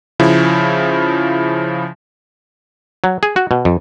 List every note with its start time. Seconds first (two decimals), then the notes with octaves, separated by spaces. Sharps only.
0.20 C#3 F3 E4
3.04 F#3
3.23 G#4
3.36 F#4
3.51 B2
3.65 F2